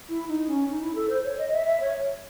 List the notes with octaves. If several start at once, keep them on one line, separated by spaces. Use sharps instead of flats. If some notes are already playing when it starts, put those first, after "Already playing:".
E4
D#4
C#4
D#4
E4
A4
C5
C#5
D#5
E5
E5
C#5